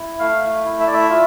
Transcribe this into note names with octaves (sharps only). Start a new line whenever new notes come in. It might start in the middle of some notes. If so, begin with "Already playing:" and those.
Already playing: E4
A3 F5
E4
E5
D5
E5
F4